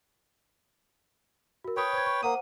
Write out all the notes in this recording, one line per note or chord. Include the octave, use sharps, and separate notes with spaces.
F#4 A#4
B4 C#5 G5 C#6 D#6
C5 G#6
C#6
A#3 C5 F#5 D#6 D#7